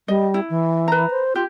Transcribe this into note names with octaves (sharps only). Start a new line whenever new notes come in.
G3 D#5
E4
E3
B4 A#5
C5
F4 G4